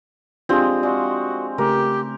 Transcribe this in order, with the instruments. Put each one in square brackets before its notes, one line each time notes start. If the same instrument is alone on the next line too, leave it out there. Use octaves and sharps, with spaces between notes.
[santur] G#3 C4 [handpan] D4 F4 G4
[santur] G#3 [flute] F#4 [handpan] D5 F5
[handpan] C#3 A3 [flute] G4 [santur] A#4